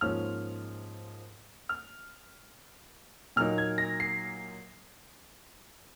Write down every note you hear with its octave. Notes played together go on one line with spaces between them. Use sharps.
G#2 F3 A#3 C#4 F6
F6
A#2 F#3 A#3 D#4 F6
G#6
A#6
C7